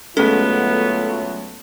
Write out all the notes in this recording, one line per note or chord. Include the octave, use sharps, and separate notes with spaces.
D2 F#3 G#3 A3 B3 C#4 F4 A4